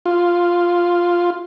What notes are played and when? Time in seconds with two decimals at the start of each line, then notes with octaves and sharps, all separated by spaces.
0.06 F4